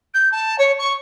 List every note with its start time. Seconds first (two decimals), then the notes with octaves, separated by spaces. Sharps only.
0.14 G6
0.31 A5
0.58 C#5
0.78 C#6